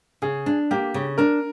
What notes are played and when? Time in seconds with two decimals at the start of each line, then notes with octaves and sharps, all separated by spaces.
0.22 C#3 G#4
0.46 D4
0.71 A#3 G4
0.94 C#3
1.18 D4 A#4